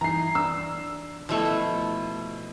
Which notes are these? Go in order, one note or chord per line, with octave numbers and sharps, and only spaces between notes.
E3 D#4 A#5 C7
D4 E6
B2 F3 A3 E4 C#6